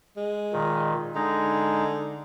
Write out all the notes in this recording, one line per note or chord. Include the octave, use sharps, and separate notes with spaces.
G#3
A#2 D#3
D3 G#3 D#4